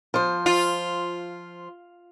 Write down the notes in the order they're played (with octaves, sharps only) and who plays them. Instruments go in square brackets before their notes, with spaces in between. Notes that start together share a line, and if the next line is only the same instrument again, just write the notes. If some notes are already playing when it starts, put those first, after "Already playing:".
[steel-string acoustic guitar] F3 C5
[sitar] F4